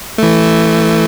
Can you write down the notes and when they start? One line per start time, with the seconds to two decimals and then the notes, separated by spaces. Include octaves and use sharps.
0.18 E3 A3